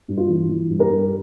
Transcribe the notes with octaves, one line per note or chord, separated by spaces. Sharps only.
G2
F4
E3
E3
G2
G4 A#4
G2